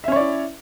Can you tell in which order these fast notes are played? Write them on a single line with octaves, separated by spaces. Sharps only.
E5 C#4 C#5 D5 E4